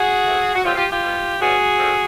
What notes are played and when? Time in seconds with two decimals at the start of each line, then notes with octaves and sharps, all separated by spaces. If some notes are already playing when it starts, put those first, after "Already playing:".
Already playing: F#4 G#4
0.25 E3 A3 C4
0.54 F#4
0.63 B2 F#3 A3 C4 F4 G4
0.75 F4 G4
0.89 F4 G4
1.01 B2 G3 B3
1.39 C#3 E3 G3 B3 F#4 G#4
1.78 D3 F3 A3 C4